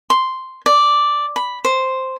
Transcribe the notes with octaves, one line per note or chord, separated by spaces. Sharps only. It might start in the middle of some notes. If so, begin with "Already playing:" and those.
C6
D5
B5
C5